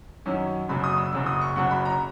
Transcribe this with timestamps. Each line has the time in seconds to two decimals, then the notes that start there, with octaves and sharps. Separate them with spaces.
0.26 F#2 D#3 F#3 C#4
0.69 F#1 F#2 C#3 F#3 B5
0.84 D#6
0.98 E6
1.12 F#1 F#2 C#3 F#3 E6
1.26 D#6
1.41 C#6
1.56 F#1 F#2 C#3 F#3 F#5
1.71 B5
1.85 A#5